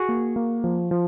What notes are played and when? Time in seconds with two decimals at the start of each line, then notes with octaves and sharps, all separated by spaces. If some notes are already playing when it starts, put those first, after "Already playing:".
Already playing: F#4 G#4
0.09 A#3
0.36 A#3
0.64 F3
0.91 F3